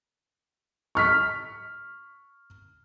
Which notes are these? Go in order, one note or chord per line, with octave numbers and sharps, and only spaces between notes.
C#6 F6 B6